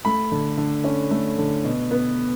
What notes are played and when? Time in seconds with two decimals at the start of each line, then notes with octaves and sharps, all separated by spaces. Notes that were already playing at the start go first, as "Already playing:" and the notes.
0.05 A3 B5
0.32 D3
0.57 D3
0.84 C#4
1.11 A3
1.38 D3
1.64 B2
1.91 B3